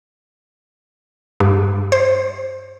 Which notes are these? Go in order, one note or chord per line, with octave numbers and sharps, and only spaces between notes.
G2
C5